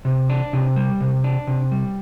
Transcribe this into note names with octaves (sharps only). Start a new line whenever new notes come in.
C3
D4
C3
G3
C3
D4
C3
G3